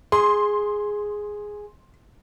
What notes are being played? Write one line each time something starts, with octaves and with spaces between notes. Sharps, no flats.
G#4 C6